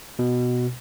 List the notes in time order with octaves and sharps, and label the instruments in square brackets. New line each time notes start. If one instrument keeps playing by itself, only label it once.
[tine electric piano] B2